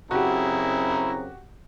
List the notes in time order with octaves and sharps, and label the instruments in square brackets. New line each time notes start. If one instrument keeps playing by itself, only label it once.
[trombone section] F#2 C#3 C4 [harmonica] E4 A#5 [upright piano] F#4 G4